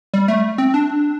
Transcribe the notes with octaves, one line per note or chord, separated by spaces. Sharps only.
G3
A3
C4
D4